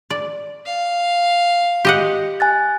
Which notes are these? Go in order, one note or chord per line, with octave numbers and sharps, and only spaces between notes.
D5
F5
G4 D#5 F#5
G#5 F#6 A6